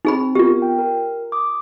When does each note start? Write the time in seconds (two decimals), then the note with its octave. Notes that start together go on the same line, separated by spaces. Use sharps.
0.05 C4 D#4 G#4 B5
0.35 B3 F4 G4 A#4
0.62 G5
0.79 A#4
1.32 D6 D#6